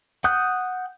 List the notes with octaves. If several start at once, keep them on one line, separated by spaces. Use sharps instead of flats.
F#5 G5 D#6 F#6 G6